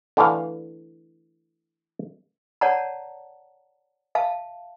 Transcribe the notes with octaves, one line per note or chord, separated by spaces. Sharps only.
D3 E3 A3 F5
C#5 D5 F#5 A5 A#5
E5 F5 A5